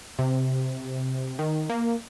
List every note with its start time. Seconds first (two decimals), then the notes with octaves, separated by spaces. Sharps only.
0.19 C3
1.39 D#3
1.70 A#3